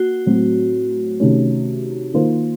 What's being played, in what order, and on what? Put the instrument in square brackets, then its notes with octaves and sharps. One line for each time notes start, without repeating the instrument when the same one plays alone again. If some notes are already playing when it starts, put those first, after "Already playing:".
Already playing: [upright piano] A#3 [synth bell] F#4
[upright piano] A2 F#3 C4
C3 D#3 A3 C#4
D#3 A#3 F4 C5